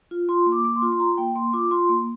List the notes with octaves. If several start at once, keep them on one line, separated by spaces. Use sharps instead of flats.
F4
F4 C6
A#3
D6
A#3 D6
C6
F4
C6
F4 A#5
A#3 G5
A#3 C6
F4 D6
F4 C6
A#3